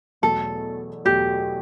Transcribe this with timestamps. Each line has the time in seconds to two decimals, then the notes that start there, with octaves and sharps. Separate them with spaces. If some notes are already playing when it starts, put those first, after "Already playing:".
0.22 E2 B2 F#3 A3 A4
1.05 E2 B2 F#3 A3 G4